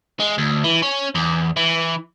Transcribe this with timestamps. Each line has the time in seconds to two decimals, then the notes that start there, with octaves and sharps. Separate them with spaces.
0.20 G#3
0.38 D2
0.64 E3
0.82 C#4
1.15 E2
1.57 E3